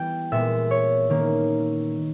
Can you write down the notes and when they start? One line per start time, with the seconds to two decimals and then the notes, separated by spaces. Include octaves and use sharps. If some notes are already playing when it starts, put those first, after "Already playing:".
Already playing: E3 G3 B3 G5
0.32 A#2 G#3 B3 E5
0.71 C#5
1.10 D#3 A#3 C#4